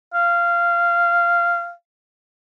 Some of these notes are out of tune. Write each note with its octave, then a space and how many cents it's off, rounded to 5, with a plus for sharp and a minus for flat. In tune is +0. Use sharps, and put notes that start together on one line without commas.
F5 -15